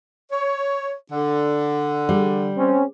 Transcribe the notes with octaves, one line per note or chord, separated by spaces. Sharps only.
C#5
D3
G3
C4 C#4